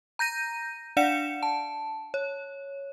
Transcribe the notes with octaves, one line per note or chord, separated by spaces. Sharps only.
A#5 G6 A#6 D#7
D4 D5 F5 F#5 C#7 E7
A5
C#5